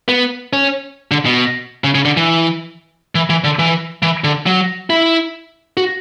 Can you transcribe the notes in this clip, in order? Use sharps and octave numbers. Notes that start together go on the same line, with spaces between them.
B3
C#4
D3
B2
C#3
C#3
D3
E3
E3
E3
D3
E3
E3
D3
F#3
E4
F#4